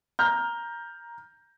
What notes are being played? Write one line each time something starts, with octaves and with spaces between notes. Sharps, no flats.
A#5 F6 G6